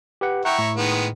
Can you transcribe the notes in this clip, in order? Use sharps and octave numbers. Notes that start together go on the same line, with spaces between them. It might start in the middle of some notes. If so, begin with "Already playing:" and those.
G4 B4 F#5
E4 F#5 G5 A#5 C#6
A2
D#3 G#3 B3